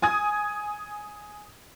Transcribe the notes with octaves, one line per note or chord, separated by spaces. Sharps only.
G#5 D#6 G#6